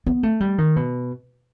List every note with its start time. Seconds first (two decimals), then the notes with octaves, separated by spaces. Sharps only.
0.06 B3
0.23 A3
0.40 G3
0.58 D#3
0.76 B2